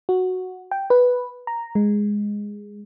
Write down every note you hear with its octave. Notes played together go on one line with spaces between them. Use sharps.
F#4
G5
B4
A#5
G#3